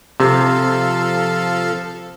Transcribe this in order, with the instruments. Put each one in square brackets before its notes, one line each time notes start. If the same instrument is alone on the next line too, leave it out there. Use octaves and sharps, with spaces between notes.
[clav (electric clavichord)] C3 [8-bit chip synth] F3 A4 F5